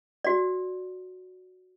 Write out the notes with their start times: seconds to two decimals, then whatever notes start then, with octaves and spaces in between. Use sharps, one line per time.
0.24 F#4 D5